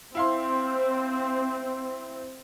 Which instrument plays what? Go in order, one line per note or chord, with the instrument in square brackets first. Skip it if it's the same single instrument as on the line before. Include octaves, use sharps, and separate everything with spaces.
[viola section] C4 [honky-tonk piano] E4 F5 C6